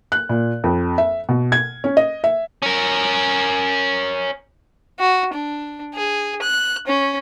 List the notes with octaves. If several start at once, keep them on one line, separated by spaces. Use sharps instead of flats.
F#6
A#2
F2
E5
B2
G#6
C#4
D#5
E5
C#4 A#4
F#4
D4
G#4
F#6
C#4